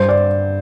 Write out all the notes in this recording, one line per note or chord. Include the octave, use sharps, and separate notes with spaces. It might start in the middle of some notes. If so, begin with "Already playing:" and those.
Already playing: G2 C5
D5